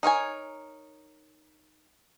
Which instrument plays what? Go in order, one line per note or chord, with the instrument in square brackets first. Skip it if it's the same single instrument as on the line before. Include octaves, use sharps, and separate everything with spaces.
[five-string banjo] D#4 A#4 C#5 G#5